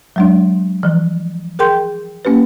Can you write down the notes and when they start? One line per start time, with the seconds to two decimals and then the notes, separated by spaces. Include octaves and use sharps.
0.16 F#3 G#3 D4
0.83 E3 F3
1.59 G#4 A#4 G5 C6 G6
2.25 A#3 C#4 G4 B4